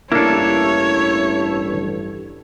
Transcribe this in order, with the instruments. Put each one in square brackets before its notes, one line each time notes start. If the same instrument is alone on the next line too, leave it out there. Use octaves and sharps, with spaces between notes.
[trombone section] A1 G2 [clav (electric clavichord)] A#3 D4 [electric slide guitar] E4 A4 [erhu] C#5